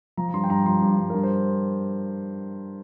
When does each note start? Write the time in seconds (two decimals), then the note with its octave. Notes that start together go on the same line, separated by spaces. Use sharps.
0.17 F3 A#5
0.29 A#5
0.34 G2 C6
0.44 G5
0.50 G2 A#5
0.66 F3 C6
0.82 G2
0.98 G2
1.10 G2 A#4
1.23 C5